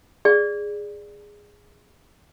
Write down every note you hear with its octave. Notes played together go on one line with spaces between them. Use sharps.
G#4 D5